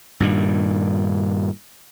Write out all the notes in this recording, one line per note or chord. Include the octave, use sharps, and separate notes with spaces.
G2 A#2 D#3